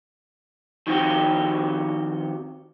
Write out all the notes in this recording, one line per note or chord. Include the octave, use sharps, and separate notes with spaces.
D#3 F3 C4 F#4 G4